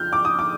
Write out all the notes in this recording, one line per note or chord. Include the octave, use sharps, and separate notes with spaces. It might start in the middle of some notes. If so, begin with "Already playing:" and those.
Already playing: F2 D3 F3 F6 G6
D6
D#6
D6